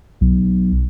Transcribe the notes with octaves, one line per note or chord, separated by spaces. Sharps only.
B1